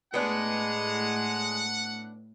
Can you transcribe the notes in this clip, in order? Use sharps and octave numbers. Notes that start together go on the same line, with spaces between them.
A2 G#3 B3 D4 F#5